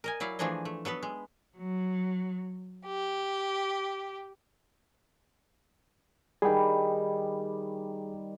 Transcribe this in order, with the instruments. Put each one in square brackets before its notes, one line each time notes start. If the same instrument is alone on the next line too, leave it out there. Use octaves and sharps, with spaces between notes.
[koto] A#4 D#5 G#5
F#3 E4 D5 F5
E3 F3 A3 D4 G#4 D#5
A3
F#3 B3 A4 B4
G#3
[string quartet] F#3
G4
[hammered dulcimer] D#3 G3 [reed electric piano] G#4 G5